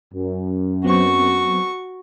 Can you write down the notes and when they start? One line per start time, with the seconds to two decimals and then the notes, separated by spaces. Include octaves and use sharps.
0.14 F#2
0.84 F#3 B3 C4 F#4 C#6